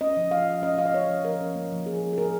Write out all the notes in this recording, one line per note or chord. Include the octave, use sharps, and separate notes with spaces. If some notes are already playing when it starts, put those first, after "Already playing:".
C#4 D#5
F3
C#4 F5
F3
C#4 D#5
F3 F5
D#5
C#4 C#5
F3
F3 A#4
C#4
A#3
F3
F3 G#4
C#4
G#4
A#3 A#4